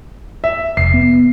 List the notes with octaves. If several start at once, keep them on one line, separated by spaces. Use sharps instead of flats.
E5
F1 C7
B3